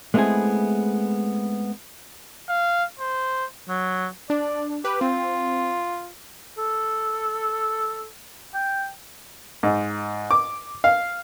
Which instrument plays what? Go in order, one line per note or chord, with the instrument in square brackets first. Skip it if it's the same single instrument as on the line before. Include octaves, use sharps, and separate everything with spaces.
[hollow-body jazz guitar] G#3 A3 B3 C4 E4 G#4
[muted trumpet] F5
C5
[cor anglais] F#3
[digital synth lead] D4 [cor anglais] D5
[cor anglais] G4 [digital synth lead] B4
[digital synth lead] C4 [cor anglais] F4
[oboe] A4
G5
[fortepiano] G#2
D6
F5